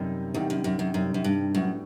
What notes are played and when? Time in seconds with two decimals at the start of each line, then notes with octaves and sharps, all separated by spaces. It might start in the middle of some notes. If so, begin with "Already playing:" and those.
Already playing: F#2 C3 D#3 G3 D#4
0.34 E2 C3 D#3 G3 D#4
0.50 F#2
0.64 F#2
0.79 F#2
0.94 F#2 C3 D#3 G3 D#4
1.14 F#2
1.24 G2
1.54 F#2 A2 G3 B3 F#4